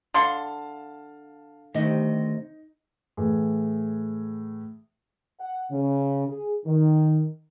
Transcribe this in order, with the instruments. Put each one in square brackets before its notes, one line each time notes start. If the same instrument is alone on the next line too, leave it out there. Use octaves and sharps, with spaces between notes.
[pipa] D3 C6 [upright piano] F5 A5
[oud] D2 C3 [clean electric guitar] D#3 A3 D#5 [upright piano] D#4
[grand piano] A2 E3 G#4
[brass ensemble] F#5
C#3
G#4
D#3